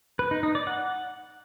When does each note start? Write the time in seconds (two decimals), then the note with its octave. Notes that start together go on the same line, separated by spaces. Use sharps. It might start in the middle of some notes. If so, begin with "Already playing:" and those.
0.19 B4
0.31 D#4
0.43 D#4
0.55 D5
0.67 F#5